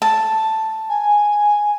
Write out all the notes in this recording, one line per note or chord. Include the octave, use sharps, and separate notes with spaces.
A5
G#5